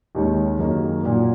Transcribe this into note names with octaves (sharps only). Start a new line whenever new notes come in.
D#2 D#3 G#3 C#4
F#2 D#3 A#3
A#2 F#3 A#3